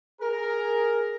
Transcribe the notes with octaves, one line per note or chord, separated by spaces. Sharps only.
G#4 A#4